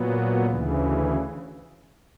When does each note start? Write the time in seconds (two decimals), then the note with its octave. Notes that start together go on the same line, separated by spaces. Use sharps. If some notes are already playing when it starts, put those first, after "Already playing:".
Already playing: A#2 F#3 B3
0.45 D2 C#3 E3